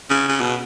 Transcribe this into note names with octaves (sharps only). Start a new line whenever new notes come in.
C#3
C#3
B2